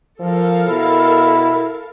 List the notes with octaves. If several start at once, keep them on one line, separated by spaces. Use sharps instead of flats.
F3 A4 A#4 F5
B2 E4